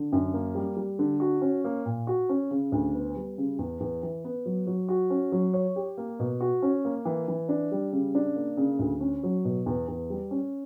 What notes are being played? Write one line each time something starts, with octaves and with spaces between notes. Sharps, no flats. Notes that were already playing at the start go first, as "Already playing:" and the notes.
Already playing: D3
F#2
A#3
G3
G3
D3
F#4
C#4
A#3
A#2
F#4
C#4
C#3
D2
B3
G3
C#3
E2
E2
E3
B3
F#3
F#3
F#4
C#4
F#3
C#5
G4
A#3
B2
F#4
C#4
A#3
E3
E3
D4
G3
C#3
D4
A#3
C#3
D2
C#4
F#3
B2
E2
E2
G3
C#4